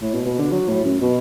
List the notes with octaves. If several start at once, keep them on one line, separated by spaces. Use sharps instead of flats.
A2
B2
B2
D3
F#3
A2
F#2
B2